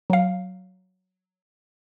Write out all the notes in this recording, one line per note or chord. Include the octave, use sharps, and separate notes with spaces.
F#3 F5